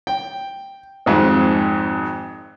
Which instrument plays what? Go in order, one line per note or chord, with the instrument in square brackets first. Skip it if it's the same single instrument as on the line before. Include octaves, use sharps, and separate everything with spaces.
[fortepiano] G5
G#1 F2 G#2